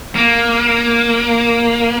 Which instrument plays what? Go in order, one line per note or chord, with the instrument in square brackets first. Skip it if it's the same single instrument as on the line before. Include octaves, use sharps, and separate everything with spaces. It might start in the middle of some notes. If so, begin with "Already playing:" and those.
[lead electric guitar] A#3